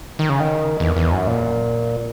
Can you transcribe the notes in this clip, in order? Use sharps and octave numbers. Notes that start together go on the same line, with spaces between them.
D#3
C#3
D#3
E2
E2
F#2
A#2